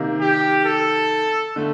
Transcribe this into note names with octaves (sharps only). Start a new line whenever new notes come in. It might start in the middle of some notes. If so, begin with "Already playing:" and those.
Already playing: C3 D#3 A#3
G4
A4
D3 A3